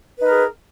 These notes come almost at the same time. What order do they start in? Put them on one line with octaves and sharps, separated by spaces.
B4 D#4 A#4 G#4